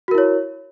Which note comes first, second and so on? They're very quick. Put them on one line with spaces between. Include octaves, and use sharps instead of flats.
F#4 A#4 E4 C#5